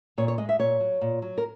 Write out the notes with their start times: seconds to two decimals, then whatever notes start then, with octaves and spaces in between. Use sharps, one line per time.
0.18 A#2 C#5
0.28 C#5
0.38 G#3 D#5
0.49 E5
0.59 A#2 C#5
0.80 F#3
1.01 A#2
1.22 F#3
1.38 A#4